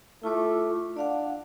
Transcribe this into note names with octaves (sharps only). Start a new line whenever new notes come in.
A3 E4 F4 D6
D4 D5 F5 F#5